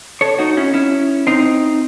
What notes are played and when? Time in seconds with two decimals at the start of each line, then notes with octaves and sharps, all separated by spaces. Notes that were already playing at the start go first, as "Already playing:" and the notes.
0.21 A4 C#5
0.39 D#4 F#4
0.57 C#4 E4
0.74 C#4 E4
1.27 C4 D#4